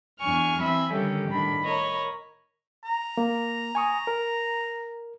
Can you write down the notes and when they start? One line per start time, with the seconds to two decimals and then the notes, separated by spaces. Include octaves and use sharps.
0.20 E2 D4 G#5 C#6 F6
0.62 E3 C4 E5 G#5 B5
0.92 D3 D#3 G3 C#4 G4 A4
1.29 A2 D#3 D4 B5
1.64 A#4 C#5 D#5 B5
2.84 A#5
3.17 A#3
3.75 G#5 C#6 D#6
4.07 A#4